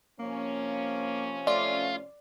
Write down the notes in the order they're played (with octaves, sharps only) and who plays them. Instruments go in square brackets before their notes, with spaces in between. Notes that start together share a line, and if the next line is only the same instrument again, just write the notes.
[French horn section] C3 F3 C#4 [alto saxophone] A#3
[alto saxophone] A3 [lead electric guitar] F4 [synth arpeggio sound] D5